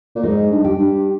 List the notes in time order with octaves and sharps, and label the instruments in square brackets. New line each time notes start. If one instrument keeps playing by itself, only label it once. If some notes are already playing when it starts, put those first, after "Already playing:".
[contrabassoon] A#2
[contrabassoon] G#2 [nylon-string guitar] D#4
[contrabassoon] G2
[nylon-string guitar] G4
[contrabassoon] G2